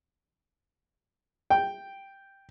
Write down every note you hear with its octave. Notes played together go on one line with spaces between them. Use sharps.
G5